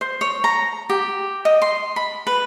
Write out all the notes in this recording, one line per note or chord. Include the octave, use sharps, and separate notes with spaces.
C5
C#5
A#5
G4
D#5
C6
B5
B4